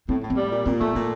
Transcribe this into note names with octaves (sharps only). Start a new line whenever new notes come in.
A2 C4
A2
C4
G3
A#2
A#2 C4
A3 A#3
A#2 A#3